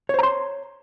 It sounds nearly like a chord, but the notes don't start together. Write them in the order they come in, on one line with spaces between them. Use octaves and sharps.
C#5 C5 A#5 C6